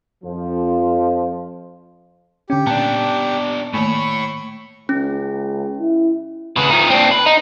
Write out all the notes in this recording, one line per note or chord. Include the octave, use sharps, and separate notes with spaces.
F2 F3
D3 C#4 G4
A#2 B3 D4 A5
A2 D#3 A3 A#3 C#5 B5 C#6
C#2 C#4
E4
C#3 B4
F3 D#4
C4 D4
B4
D#4